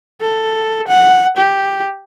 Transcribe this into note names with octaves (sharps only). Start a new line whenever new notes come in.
A4
F#5
G4